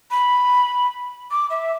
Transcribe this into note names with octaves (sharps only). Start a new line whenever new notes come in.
B5
D6
E5